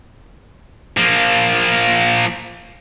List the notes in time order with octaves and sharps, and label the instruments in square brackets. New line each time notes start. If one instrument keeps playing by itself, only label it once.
[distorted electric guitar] F3 A#3